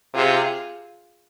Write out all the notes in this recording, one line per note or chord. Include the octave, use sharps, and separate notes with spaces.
C3 F4 G#4